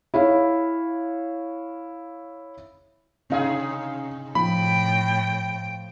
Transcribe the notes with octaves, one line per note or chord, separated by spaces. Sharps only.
E4 G#4 C#5 F5
C3 C#4 D#4 G#4 F5
A2 F3 G5 B5